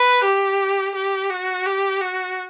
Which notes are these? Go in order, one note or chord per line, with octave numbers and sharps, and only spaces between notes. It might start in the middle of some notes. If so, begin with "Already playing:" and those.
Already playing: B4
G4
G4
F#4
G4
F#4